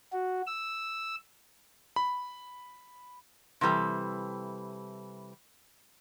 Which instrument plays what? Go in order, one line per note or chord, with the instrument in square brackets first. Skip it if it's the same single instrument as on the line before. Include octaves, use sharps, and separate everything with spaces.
[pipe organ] F#4
E6
[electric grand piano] B5
[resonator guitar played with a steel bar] C3 E3 G3 A4